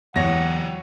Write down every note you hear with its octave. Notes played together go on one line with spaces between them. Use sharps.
E2 E3 F#3 G4 C#5 F#5 A#6